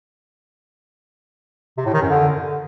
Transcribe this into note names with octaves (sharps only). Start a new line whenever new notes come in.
C3
A2
D#3
F#2
D3